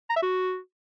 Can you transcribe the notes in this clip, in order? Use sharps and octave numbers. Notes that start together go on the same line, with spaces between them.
A#5
E5
F#4